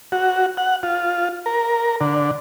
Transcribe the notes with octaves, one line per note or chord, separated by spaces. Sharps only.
F#4
F#5
F4
A#4
D3